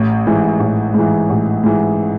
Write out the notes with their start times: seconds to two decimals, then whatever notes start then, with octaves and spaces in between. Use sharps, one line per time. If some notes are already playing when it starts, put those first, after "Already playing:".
Already playing: A1
0.27 G#2 E3
0.60 A1
0.94 G#2 E3
1.30 A1
1.64 G#2 E3